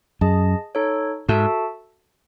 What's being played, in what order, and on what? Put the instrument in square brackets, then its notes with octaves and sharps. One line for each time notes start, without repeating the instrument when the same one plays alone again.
[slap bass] F#2 [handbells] G#4 D#5 A5
[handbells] D#4 A4 C#5
[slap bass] G#2 [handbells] F#4 A4 E5 A5